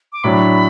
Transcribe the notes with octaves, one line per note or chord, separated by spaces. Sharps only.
D6
A2 F#3 D4 B5